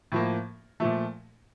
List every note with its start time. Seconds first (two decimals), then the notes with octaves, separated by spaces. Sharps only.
0.12 A2 F3 A#3
0.80 A#2 F3 A3